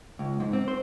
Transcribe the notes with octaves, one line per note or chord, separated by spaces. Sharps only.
C#2
G#2
C4
C5